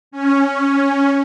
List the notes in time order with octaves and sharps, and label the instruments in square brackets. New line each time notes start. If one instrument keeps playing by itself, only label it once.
[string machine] C#4